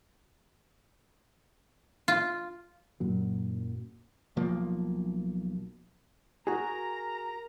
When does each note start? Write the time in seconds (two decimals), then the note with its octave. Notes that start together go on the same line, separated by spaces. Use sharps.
2.08 F4
3.00 F#2 A#2 F#3
4.37 B1 F3 A#3
6.47 F#4 G#4 A#4 A#5